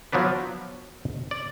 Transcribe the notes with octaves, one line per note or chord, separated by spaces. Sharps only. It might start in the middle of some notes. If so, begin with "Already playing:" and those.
F3 F#3 B3 D4 B4
D5